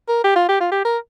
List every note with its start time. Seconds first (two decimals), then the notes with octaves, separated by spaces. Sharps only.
0.08 A#4
0.24 G4
0.36 F4
0.48 G4
0.60 F4
0.72 G4
0.85 A#4